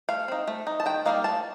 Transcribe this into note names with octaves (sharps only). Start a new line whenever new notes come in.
A3 F5
C4 D#4
A3
D#4
A5
D#3 G5
G3 A#3 D#4 F5
A3 A5